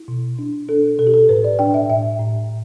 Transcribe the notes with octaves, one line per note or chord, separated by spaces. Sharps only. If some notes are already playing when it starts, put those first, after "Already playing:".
Already playing: E4
B2
D4
D4 A4
B2 A4
G4
A4
A2 B4
D5
D4 G5
E5
A2 E5
A2